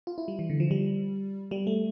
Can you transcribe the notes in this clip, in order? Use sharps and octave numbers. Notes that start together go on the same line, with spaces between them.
F4
E4
G3
E3
D3
F3
G3
G3
A3